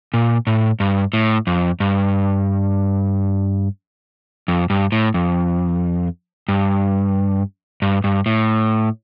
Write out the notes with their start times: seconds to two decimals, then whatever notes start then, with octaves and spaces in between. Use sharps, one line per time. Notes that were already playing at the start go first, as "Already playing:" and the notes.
0.14 A#2
0.47 A2
0.80 G2
1.13 A2
1.47 F2
1.80 G2
4.48 F2
4.70 G2
4.92 A2
5.14 F2
6.48 G2
7.82 G2
8.04 G2
8.26 A2